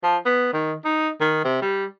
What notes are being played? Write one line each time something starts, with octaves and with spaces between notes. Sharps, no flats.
F3
B3
D#3
D#4
D#3
C3
G3